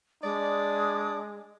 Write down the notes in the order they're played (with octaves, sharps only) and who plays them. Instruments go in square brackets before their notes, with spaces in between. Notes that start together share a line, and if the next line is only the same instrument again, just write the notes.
[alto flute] G#3 [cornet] D4 [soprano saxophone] D5 [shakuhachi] D#6